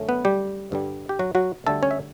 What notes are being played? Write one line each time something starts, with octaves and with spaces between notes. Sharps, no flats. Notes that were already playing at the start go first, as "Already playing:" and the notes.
Already playing: F#2 D3 F#3 A3 C#4
B3 B4
G3 G4
G2 D3 G3
G4
F#3 F#4
F#3 F#4
D2 D3 G3 A3 A4
C#4 C#5
E5